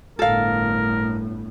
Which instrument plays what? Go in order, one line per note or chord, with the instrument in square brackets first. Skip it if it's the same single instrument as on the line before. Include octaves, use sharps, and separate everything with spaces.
[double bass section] G1 A2 [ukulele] A4 F5 [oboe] A#4